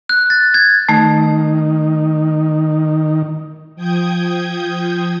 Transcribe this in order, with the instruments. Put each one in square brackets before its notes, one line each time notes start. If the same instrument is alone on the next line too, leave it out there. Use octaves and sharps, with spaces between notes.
[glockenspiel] F#6
A6
G#6
[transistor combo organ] D#3 [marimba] A3
[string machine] F3 G5 D#6 G6 G#6